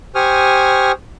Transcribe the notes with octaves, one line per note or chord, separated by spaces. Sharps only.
G4 C5 G#5 C#6 D#6 F6